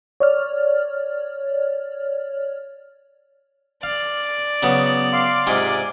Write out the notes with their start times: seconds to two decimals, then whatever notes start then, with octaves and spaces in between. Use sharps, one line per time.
0.20 C#5 D5 F6
3.83 D5 F5
4.63 C#3 F#3 B3
5.13 F5 C6 D6
5.47 G#2 C3 F4 G#5 D6